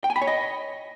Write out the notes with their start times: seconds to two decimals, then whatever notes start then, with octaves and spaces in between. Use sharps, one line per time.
0.04 G5
0.10 G#5
0.16 B5
0.22 C#5
0.27 D#5